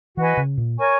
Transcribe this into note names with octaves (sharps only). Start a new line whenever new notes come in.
E3 F#4 B4 D#5 G#5
C#3
A#2
A#4 C#5 G#5 C#6